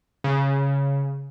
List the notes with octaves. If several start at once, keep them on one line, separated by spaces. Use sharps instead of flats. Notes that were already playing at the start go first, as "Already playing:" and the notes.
C#3